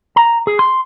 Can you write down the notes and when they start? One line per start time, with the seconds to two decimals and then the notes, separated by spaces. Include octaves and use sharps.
0.16 A#5
0.47 G#4
0.59 C6